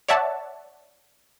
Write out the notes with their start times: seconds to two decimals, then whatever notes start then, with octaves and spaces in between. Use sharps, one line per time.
0.08 C#5 D5 E5 F#5 A5